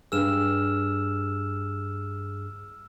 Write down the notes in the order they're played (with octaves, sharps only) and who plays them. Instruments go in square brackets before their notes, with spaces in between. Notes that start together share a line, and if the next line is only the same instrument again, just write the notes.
[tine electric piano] G2 G#4 [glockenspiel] E6 F6 E7